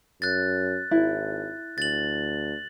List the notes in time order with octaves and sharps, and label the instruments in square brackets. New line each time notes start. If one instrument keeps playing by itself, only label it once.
[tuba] F#2 [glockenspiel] F#6 A6
[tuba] G#1 [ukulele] E4
[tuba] D2 [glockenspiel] A6 F#7